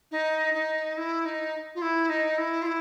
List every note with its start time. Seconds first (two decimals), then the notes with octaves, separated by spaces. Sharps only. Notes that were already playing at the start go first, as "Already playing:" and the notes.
0.11 D#4
0.54 D#4
0.97 E4
1.25 D#4
1.75 F4
1.81 E4
2.09 D#4
2.37 E4
2.62 F4
2.66 E4